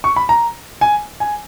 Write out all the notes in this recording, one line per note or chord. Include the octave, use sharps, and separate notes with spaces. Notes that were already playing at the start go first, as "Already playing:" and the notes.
C#6
B5
A#5
G#5
G#5